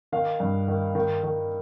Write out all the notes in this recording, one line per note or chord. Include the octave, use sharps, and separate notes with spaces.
D#3 F5
G2
D#3
D#3
D#3